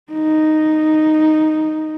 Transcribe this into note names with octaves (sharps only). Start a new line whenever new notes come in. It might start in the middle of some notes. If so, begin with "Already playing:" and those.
D#4